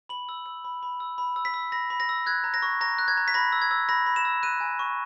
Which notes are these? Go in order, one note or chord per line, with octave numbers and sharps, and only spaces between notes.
B5 F#7
E6
E6
B5
B5
E6
B5
E6
B6
E6
B5 A#6
B5
A#6
E6
F#6 G#6
A#5
A#6
C#6
A#5 A#6
F#6
G#6
A#5
B6
B5 A#6
E6
G#6
E6
B5 A#6
B5
E7
E6
F#6 D#7
G#5
C#6